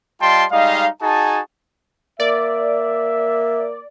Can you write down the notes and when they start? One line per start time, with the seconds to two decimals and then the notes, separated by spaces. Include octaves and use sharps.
0.21 G3 F4 D#5 G5 A5 C6
0.52 G3 G#3 D#4 D#5 F5
1.02 D#4 F#4 G#4 G#5 A5
2.20 A#3 D5 E5